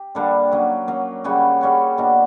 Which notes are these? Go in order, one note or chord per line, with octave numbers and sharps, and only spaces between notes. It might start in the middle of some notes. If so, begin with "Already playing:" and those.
Already playing: G4
D3 G3 A#3 D4
F#3 A#3 C#4
F#3 A#3 C#4
C#3 G3 C#4 F#4
C#3 G3 C#4 F#4
B2 A#3 D4 F#4